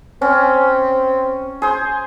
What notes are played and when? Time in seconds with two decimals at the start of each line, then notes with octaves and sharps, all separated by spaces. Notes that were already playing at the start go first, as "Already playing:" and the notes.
0.22 C4 C#4
1.62 G#4 C5